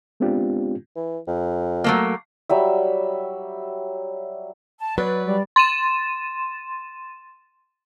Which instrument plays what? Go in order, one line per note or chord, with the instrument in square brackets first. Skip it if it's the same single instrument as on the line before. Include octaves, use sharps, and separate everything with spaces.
[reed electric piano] G#3 B3 C4 D4 F4 G4
[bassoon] E3
F2
[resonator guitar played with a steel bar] F#3 A3 A#3
[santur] F#3 G3 E5
[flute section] A5
[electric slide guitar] F#3 [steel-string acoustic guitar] B4 [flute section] D5
[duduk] G3 [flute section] D5
[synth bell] C6 A6 D#7 E7